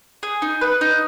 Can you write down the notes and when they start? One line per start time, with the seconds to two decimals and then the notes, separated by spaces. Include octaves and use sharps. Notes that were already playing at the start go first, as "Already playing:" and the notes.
0.23 G#4
0.42 D#4
0.61 B4
0.81 D#4